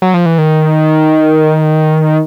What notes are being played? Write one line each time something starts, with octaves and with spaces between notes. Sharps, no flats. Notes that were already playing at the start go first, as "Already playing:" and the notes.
F#3
F3
E3
D#3